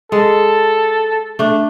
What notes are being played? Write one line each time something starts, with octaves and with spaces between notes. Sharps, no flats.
G#3 A4
A3 D4